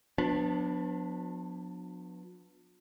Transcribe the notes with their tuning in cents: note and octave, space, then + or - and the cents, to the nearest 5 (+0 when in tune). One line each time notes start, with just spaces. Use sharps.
F3 +45 B3 +0 D4 +0